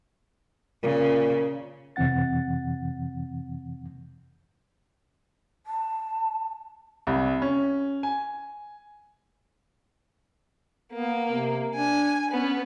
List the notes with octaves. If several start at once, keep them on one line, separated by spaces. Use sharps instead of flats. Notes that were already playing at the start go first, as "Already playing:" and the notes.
A#2 C#3
F2 C3 E3 C4 F#5 A6
A5
C2
C#4
G#5
A#3 B3
C3
D4 G#5
B3 C#4